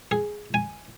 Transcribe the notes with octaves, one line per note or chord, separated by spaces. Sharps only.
G#4
G#5